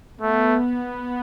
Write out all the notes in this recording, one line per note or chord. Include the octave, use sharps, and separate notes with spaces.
A3 B3